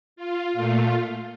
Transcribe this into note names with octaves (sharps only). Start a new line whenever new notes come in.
F4
A#2 A3 F4